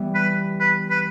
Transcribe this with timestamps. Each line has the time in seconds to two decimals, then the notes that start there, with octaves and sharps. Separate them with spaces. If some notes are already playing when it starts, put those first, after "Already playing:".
Already playing: E3 G3 B3
0.14 B4
0.60 B4
0.90 B4